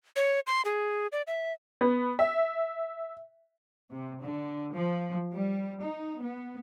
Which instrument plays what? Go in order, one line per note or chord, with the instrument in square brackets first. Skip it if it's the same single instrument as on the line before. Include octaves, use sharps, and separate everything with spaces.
[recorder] C#5
C6
G#4
D5
E5
[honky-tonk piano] B3
E5
[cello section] C3
D3
F3
G3
D#4
B3